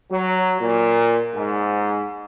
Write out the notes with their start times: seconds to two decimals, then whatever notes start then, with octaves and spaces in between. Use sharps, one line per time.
0.11 F#3
0.61 A#2
1.34 G#2